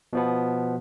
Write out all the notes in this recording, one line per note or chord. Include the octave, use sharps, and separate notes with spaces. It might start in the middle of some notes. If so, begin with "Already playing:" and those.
B2 F3 B3